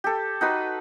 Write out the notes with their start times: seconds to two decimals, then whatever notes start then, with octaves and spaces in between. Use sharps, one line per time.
0.04 G4 A4
0.41 D#4 F#4 B4